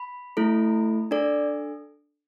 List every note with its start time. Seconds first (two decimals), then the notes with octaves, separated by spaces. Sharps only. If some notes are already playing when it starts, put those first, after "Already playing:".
Already playing: B5
0.37 A3 E4 A4
1.11 D4 A4 D5